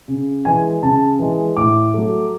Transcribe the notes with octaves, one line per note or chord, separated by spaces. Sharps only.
C#3
E3 G#3 G#5
C#3 A5
E3 G#3
A2 D6
F#3 A3